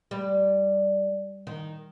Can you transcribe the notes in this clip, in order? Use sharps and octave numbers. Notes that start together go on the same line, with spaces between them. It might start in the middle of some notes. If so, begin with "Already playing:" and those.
G3
D#3